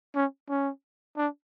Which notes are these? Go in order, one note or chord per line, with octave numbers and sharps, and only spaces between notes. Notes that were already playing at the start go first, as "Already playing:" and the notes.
C#4
C#4
D4